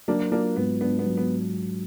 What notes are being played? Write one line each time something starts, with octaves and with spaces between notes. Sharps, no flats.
F#3 A#3 D4
A#3 D4 F4
G#2 B3
B3 D4
B3
F#3
B3